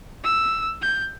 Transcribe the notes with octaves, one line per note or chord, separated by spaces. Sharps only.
E6
G6